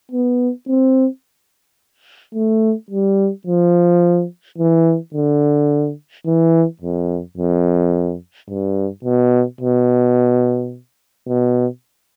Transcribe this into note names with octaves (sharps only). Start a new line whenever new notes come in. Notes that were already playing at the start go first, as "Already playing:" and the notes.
B3
C4
A3
G3
F3
E3
D3
E3
F2
F2
G2
B2
B2
B2